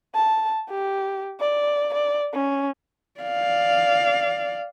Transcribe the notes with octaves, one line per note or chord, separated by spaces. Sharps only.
A5
G4
D5
D5
C#4
D5 F5